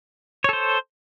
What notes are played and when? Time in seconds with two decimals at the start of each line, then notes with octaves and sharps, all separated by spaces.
0.44 C#5
0.49 A4
0.53 C5